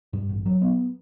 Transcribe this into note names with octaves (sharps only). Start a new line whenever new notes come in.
G2
A1
F#3
B3